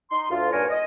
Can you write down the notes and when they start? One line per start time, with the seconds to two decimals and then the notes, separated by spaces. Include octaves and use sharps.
0.11 D#4 C6
0.30 D2 F4
0.52 G2 A#2 D#3 A#4 C#5 G#5
0.70 D#5